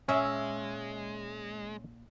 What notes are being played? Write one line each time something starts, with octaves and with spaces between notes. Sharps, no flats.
A#2 G#3 C#4 E5